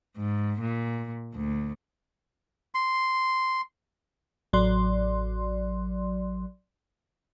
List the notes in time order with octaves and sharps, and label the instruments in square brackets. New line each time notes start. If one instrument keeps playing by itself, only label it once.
[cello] G#2
A#2
D2
[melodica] C6
[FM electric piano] A1 F#3 D5 C6